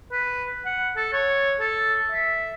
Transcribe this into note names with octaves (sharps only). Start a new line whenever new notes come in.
B4
F#5
A4
C#5
A4
E5